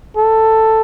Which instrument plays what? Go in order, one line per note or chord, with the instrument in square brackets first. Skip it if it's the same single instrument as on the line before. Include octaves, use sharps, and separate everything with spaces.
[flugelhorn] A4